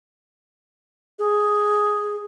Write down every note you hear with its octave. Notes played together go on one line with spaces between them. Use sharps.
G#4